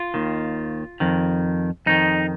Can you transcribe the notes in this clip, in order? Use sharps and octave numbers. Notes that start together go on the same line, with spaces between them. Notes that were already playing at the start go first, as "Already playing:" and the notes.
Already playing: F4
D#2 D#3
F2 D#3
F2 D#3 D#4